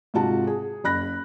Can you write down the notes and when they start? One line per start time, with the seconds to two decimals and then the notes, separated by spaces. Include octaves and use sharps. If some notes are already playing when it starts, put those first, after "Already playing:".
0.14 G#2 C3 F4 F#4 A5
0.47 G#4
0.84 F#1 B5 F#6 A#6